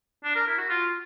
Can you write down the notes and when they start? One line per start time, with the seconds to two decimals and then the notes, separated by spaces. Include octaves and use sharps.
0.24 D4
0.35 A#4
0.47 E4
0.58 F#4
0.69 F4